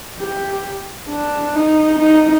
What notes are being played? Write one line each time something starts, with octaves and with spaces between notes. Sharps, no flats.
G4
D4
D#4
D#4